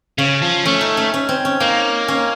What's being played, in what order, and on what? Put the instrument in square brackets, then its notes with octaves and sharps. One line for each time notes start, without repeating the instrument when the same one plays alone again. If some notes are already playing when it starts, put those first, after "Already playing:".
[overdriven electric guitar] C#3 [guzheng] C#4
[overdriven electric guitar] F3
[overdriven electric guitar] A3 [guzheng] C#4
[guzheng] D#4
C#4
C#4
C4
C#4
[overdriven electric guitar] A#3 [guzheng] D#4
[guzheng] C#4